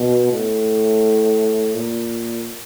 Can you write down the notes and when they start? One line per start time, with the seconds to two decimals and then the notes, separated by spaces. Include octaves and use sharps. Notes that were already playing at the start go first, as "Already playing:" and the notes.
Already playing: B2
0.32 A2
1.74 A#2